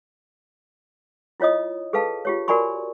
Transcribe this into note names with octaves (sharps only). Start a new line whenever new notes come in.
E4 F4 C#5 D#5 D#6
G#4 A4 B4 F5 A5
F4 G4 C#5
F#4 A#4 D5 G#5 B5 C#6